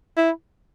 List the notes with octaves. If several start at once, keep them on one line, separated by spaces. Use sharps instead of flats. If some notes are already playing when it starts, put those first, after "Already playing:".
E4